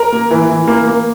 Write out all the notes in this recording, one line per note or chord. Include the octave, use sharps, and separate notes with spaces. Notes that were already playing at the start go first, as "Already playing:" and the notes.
Already playing: A#4
A#3
E3
E3
A#3
A#3